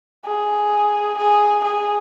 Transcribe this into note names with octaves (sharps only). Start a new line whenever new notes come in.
G#4
G#4
G#4